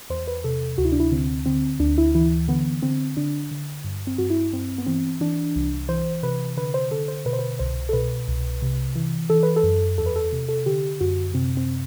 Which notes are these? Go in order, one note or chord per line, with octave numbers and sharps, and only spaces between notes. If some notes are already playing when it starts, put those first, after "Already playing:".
E2 C5
B4
C3 A4
D2 F#4
E4
D4
E4
D3 C4
D3 C4
D2 D4
E4
E3 E4
D3 B3
D3 C4
D3 D4
D3
G2
C4
G2 F#4
E4
G2 C4
B3
E3 C4
E3 D4
C2
E3 C5
C3 B4
D3 B4
C5
D3 A4
C5
B2 B4
C5
B4
C2 C5
A4
B2 B4
C2
C3
E3
E3 A4
B4
A4
F#2
E2 A4
B4
A4
C3
A4
D3 G4
F#2 F#4
C3 C4
C4